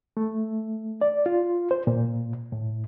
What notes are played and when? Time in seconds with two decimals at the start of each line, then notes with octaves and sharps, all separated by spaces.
0.17 A3
1.01 D5
1.26 F4
1.71 C5
1.87 A#2
2.52 A2